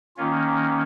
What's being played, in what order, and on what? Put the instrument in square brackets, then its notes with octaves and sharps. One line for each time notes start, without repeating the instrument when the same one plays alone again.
[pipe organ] D#3 A#3 C#4 F4